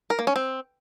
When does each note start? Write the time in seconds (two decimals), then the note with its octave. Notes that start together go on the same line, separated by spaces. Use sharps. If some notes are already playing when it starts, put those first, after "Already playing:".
0.10 A#4
0.19 A#3
0.27 C#4
0.36 C4